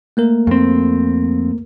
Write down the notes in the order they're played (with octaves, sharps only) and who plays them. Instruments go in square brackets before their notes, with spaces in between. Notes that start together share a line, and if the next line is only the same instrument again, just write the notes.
[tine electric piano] A3 A#3 A#4
[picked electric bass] F2 C4